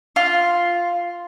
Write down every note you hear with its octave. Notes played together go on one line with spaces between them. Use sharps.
F4